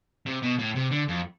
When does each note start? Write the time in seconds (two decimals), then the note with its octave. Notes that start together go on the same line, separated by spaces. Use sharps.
0.26 C3
0.42 B2
0.58 A2
0.75 C3
0.91 D3
1.08 F2